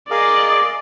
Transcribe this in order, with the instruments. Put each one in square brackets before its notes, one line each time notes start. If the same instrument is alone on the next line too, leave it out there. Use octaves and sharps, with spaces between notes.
[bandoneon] G#4 A#4 F5 [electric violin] D5 D#5